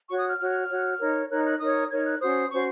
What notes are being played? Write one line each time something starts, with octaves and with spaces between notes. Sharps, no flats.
F#4 C#5 C#6
D#6
F6
F#4 C#5 F6
F#4 C#5
D#4 A#4 C#5
D#4 A#4 C#5 F#6
F#6
D#4 A#4 C#5 D#6
D#4 A#4 C#5 G#6
F#6
C#4 F#4 C5 D#6
C#4 F#4 C5 C#6